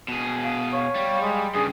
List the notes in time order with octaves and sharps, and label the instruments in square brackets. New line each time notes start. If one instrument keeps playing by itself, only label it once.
[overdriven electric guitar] B2 G#4
[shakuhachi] F5
[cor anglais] C#5 [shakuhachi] F5
[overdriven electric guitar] G3
[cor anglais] G#3
[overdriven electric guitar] G2 C#3 [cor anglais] G#4